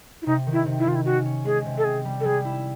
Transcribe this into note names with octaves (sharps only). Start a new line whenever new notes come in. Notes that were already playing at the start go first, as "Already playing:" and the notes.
E4
C3 D#4
D#3
E4
C3
E4
D#3 F4
E4
C#4 F#4
C#4
G#3 G#4
C3
A4
C4 G#4
G3
A4
G3 G#4
E4